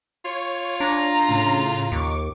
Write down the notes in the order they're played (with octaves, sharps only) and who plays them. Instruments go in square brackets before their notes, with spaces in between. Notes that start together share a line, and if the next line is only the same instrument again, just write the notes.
[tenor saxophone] F4 [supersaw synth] C#5
[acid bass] D4 [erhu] A#5
[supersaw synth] A2 C#3
[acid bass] D#2 [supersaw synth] C#6 D6